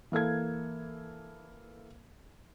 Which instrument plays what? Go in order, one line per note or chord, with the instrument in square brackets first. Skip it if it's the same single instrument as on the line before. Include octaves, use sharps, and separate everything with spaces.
[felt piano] E3 A#3 A4 G#6